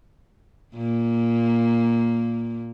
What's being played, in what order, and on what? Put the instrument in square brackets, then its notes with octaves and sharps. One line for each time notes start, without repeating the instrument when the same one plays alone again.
[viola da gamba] A#2 A#3